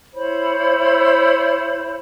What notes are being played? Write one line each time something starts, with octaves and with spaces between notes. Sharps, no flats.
E4 C5 C#5 B5